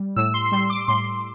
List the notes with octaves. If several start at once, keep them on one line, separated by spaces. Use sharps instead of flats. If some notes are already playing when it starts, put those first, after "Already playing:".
Already playing: G3
A2 E6
C6
G3 C6
D6
A2 C6